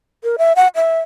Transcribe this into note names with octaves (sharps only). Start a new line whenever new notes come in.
A#4
E5
F#5
E5